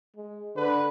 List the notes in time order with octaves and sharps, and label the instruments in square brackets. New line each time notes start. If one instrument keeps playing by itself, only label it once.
[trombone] G#3
[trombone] D3 [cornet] B4